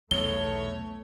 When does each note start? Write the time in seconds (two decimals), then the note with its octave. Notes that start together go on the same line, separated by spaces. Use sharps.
0.11 B1 E2 A3 C#5 G7